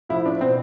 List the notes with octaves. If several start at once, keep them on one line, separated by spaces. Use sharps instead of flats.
A2 F3 E4
D4
B2 C4